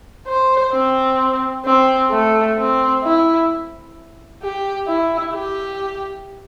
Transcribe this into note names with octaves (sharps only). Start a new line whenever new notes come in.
C5
C4
C4
A3
C4
E4
G4
E4
G4